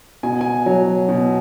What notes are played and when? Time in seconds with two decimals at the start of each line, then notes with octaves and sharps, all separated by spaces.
0.23 B2 G#5
0.41 G#5
0.66 F#3
1.09 B2